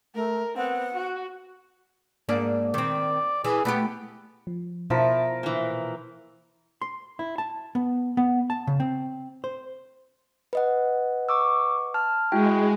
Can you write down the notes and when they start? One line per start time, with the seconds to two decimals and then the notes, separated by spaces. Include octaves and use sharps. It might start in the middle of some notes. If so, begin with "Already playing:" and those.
0.15 A3 A#4
0.57 B3 C4 F#5
0.94 F#4
2.29 G#2 A#3 D4
2.74 D#3 C4 D5
3.44 E3 G#4
3.65 A3 B3 E4 G4
4.47 F3
4.90 B2 F3 E4 A#4 A5
5.43 A#2 E3
6.82 C6
7.19 E4
7.38 A5
7.75 B3
8.17 B3
8.50 A5
8.67 C#3
8.80 C4
9.44 C5
10.53 B4 D#5 F#5
11.29 C#6 D6 E6
11.94 A5 F6
12.32 G#3 E4 F#4 G5